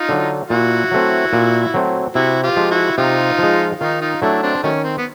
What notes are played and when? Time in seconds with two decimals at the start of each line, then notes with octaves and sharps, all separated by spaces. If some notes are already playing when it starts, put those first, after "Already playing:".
Already playing: D#4 F4
0.09 D3 F#3
0.50 A#2 E4 F#4
0.92 F#3 A3 C4
1.33 A#2
1.74 F#3 A3 C4
2.15 C3 E4 F#4
2.43 F4 G4
2.56 F3 G#3
2.71 E4 F#4
2.98 C3 D#4 F4
3.39 F3 G#3
3.80 D#3 D#4 F4
4.01 D#4 F4
4.21 F#3 A3 D4 E4
4.42 C4 D4
4.63 D#3 F#3 A3 C#4
4.84 C4
4.98 B3